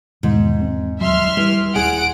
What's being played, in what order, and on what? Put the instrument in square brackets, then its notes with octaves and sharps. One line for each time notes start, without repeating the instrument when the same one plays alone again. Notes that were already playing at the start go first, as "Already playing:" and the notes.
[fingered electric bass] E2 B2 D#3 [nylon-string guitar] G#2
[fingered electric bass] E1 C3 C4
[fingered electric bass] D#1 F#3 [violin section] E5 C6 F6
[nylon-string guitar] E3 [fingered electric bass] G3
[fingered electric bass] D#1 [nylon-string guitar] G#4 [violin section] F#5 D7